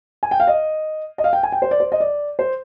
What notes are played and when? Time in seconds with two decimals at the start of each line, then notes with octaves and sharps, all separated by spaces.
0.23 G#5
0.31 G5
0.40 F5
0.47 D#5
1.18 D#5
1.24 F5
1.33 G5
1.43 G#5
1.52 G5
1.62 C5
1.71 D5
1.80 C5
1.92 D#5
2.00 D5
2.39 C5